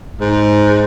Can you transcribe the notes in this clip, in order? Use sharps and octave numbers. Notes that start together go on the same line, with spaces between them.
G#2